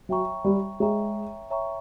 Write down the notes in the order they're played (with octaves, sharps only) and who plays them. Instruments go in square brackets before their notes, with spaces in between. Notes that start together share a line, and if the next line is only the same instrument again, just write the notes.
[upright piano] F#3 [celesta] C#5 E5 G5 A#5 C#6
[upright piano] G3
[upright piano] G#3 [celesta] C#5 E5 G5 A#5 C#6
[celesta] C#5 E5 G5 A#5 C#6